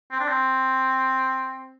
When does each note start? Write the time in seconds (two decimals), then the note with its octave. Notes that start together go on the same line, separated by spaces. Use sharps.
0.12 C4
0.20 D4
0.29 C4